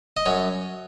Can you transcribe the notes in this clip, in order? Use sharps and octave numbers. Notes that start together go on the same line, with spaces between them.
D#5
F#2 C#5